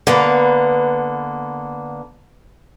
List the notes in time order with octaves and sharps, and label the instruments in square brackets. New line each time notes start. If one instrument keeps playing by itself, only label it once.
[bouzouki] D3 A#3 B3 [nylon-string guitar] B4